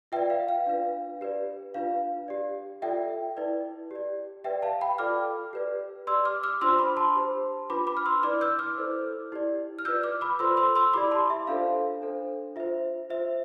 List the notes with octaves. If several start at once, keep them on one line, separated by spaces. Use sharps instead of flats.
F4 B4 D5 E5 G5
F5
F5
D4 F4 B4
G4 B4 D5
D4 F4 B4 F5
G4 D5
F4 A4 D5 E5 G5
E4 B4 D5
G4 D5
G4 B4 D5 E5 G5
F5 A5
G5 B5
F4 A4 D5 D6 F6
G4 B4 D5
G4 D5 C6 E6
D6 F6
D6 F6
D4 F4 C5 C6 E6
B5 D6
A5 C6
G4 C5
D4 F4 B4 B5 D6
B5 D6
F6
C6 E6
E4 B4 D5 D6 F6
E6 G6
D6 F6
E4 A4 C5
E4 G4 D5
F6
F4 B4 D5 E6 G6
D6 F6
B5 D6
F4 A4 C5 C6 E6
C6 E6
C6 E6
E4 G4 D5 B5 D6
A5 C6
E5
D4 F4 A4 C5 F5
D4 A4 C5
F4 C5 E5
F4 C5 E5